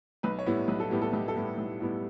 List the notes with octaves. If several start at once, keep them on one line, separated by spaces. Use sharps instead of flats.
B1 B4
C#5
A2 G3 B3 E4
B1 B4
A4
A2 G3 B3 E4 G4
A4
B1 G4
A4
A2 G3 B3 E4
G4
B1
A2 G3 B3 E4